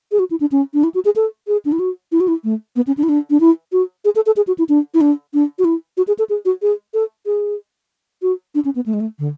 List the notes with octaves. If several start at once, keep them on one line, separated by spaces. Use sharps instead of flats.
G#4
F#4
E4
D4
C#4
D4
E4
F#4
G#4
A4
G#4
D4
E4
F#4
E4
F#4
E4
A3
B3
C#4
D4
E4
D4
D4
E4
F#4
G#4
A4
A4
G#4
F#4
E4
D4
E4
D4
D4
F#4
E4
F#4
G#4
A4
G#4
F#4
G#4
A4
G#4
F#4
D4
C#4
B3
A3
G#3
A3
D3